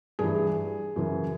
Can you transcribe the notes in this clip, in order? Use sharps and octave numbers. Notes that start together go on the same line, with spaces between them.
G2 E3 G#4
F#2 C#3 E3